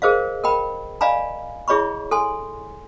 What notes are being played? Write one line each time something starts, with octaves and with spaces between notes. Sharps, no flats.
G#4 A#4 C5 D#5 F5
A#4 D#5 G5 B5
D5 D#5 F5 G#5 A#5 B5
E4 G#4 C#5 D#5 B5 C#6
A4 G#5 C6